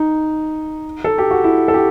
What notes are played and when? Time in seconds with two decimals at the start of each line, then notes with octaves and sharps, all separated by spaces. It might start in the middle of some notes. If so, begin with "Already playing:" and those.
Already playing: D#4
1.04 A4
1.18 G4
1.31 F#4
1.44 E4
1.68 A4
1.74 G4